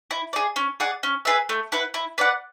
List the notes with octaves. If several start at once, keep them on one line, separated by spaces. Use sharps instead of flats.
E4
G#4 D5
C#4
G#4 D5 F#5
C#4
G#4 B4 E5
A3
E4 B4 F#5
E4
B4 D5 F#5